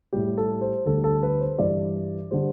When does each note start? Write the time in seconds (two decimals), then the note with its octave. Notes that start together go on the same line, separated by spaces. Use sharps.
0.13 A2 G3 G4
0.37 A4
0.61 C5
0.86 D2 D3 G3 A4
1.04 A4
1.23 B4
1.41 C5
1.59 G2 E3 G3 D5
2.31 D3 G3 C5